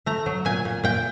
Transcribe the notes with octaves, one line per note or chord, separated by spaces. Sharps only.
A3 A#5
F#3
A#2 G#5
A#2
A#2 G5